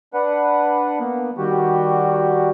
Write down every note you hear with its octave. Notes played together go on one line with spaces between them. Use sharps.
D4 B4 F#5
A#3 B3
D#3 G3 F#4 G4